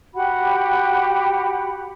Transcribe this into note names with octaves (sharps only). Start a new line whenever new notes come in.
F#4 G4 F#5 B5